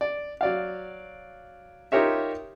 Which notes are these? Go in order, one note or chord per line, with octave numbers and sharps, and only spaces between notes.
D5
F#3 D5 F5
D#4 F4 G4 A#4 C#5 E5